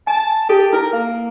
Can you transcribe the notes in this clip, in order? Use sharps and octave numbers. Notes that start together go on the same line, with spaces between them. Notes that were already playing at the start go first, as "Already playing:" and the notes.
G#5 A5
G4 A4
E4 A#4
A#3